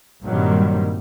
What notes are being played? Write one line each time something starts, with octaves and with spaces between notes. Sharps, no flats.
G2 A#2 D#3 F#3 G3 C4